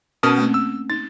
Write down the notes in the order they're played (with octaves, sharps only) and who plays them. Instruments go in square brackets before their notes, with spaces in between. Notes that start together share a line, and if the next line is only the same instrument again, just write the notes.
[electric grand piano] B2 D#6 F6 [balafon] C#4 A#4 A5
[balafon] A3 A#3 C4
[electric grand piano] E6
[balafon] D#4 [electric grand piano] A6